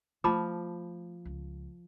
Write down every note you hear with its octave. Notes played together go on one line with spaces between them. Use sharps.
F3 A3 A5 B5 D6
C#2